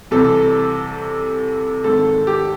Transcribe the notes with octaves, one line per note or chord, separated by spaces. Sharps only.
C2 C3 E3 A4
G#1 G#2 D#3 A4
G4